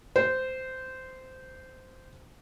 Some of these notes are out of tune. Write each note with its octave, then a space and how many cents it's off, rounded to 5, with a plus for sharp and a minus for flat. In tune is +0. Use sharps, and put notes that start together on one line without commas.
C5 -15